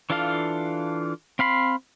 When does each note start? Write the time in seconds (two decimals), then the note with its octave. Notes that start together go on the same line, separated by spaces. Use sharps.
0.10 E3 D4 F4 A4 F5
1.39 C4 F5 B5 C6